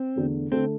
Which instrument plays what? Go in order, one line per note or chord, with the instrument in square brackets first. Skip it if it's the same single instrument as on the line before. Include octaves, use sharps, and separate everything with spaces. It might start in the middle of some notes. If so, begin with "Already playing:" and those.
Already playing: [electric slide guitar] C4
[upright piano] E2 D3 A3
[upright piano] D3 A3 [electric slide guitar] C4